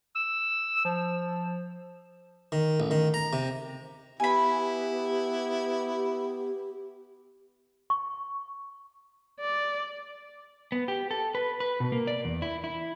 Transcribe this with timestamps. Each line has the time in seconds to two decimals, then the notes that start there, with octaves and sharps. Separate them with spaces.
0.16 E6
0.85 F3
2.52 D#3
2.80 A1
2.91 D#3
3.14 A#5
3.33 C3
4.20 B3 E4 G4 G#5 B5
7.90 C#6
9.40 D5
10.72 B3
10.88 G4
11.11 A4
11.35 B4
11.60 B4
11.80 B2
11.92 A#3
12.07 D5
12.25 E2
12.42 E4
12.64 E4